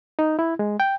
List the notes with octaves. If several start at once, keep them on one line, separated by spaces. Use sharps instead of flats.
D#4
E4
G#3
G5